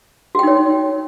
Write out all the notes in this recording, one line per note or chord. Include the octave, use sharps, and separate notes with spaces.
D#4 F#4 C#5 G5